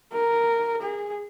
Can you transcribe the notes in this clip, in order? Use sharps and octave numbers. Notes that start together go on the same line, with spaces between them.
A#4
G#4